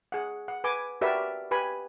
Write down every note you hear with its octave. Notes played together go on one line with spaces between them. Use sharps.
G#4 F#5
F#5
B4 G#5 D6
F#4 G4 A#4 B4 D5 E5
G4 B4 G#5 B5